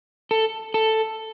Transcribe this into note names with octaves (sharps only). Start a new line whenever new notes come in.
A4
A4